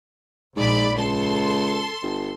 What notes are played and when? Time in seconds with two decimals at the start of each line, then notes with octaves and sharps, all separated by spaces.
0.56 A#1 G#2 D5 B5
0.98 C#2 A4 C6
2.02 G1